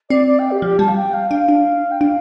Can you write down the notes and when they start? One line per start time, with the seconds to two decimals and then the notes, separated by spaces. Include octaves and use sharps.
0.10 C4 D5
0.27 D5
0.39 G5
0.51 G4
0.62 F3 G4
0.79 G3 A5
0.88 F5
0.96 G5
1.14 F5
1.31 D4 F5
1.49 D4
1.91 G5
2.01 D4 F5